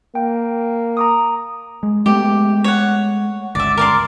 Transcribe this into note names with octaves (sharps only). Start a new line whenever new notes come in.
A#3 G5
A#5 D6 D#6
G#3
G#3 A3 B3 G4
C#5 F#5
G1 C#2 D5 E5
A#4 D5 C6